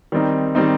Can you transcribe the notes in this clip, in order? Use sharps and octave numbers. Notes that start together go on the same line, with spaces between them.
D#3 G3 C4 D#4
D#3 G3 C4 D#4